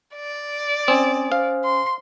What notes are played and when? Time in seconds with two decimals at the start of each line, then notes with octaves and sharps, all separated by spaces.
0.15 D5
0.88 C4 C#4 G#5 D#6
1.32 C5 F5
1.64 C6